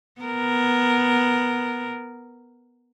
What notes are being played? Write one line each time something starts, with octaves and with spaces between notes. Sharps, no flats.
B3 A#4